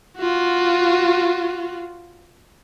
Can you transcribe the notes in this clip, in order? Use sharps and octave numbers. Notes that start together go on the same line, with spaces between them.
F4 F#4